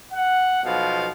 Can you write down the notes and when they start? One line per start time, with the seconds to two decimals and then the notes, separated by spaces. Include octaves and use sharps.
0.12 F#5
0.64 B1 B2 F3 F5